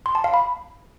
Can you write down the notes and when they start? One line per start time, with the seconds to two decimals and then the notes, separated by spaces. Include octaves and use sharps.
0.06 C6
0.15 A5
0.24 F5
0.34 B5